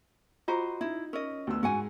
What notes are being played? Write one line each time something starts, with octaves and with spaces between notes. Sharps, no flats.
F4 F#4 C5 D#5 A#5
D#4 E4
C#4 A#4 D#5
D2 B3 E6
G#2 F#4 F#5 G#5